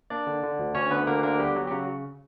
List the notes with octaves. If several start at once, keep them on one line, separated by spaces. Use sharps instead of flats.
A#3 D4 D5
D3
D3
D2
D2 C#4 C#5
D3 B3 B4
D2 A#3 A#4
D3 A#3 A#4
G3 B3 G4
F#3 F#4
G4
C#3 F#3 F#4